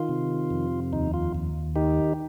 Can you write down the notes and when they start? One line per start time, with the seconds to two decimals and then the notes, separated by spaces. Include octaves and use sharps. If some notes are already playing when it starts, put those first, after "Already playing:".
Already playing: D#3 F4
0.09 C3
0.51 F2
0.93 D#2 D#4
1.14 F4
1.35 D#2
1.76 D#3 D#4 G4